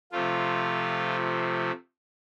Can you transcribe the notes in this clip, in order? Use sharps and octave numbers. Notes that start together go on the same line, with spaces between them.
C3 F3 A3 F4